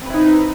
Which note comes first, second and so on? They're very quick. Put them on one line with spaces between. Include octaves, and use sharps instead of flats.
C4 B4 E4 D#4